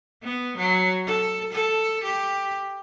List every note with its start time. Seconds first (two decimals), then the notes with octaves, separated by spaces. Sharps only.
0.23 B3
0.58 F#3
1.06 A4
1.53 A4
2.04 G4